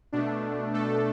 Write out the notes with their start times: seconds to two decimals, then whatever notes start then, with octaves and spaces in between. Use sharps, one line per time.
0.12 B2 A3 D4
0.74 A3 A4